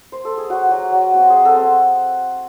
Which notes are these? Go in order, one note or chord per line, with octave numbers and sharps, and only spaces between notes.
C5
A4
G#4
F#3 F#4
F#3
F#3
C4 F#4
C4 G#4
F#4 A4
C4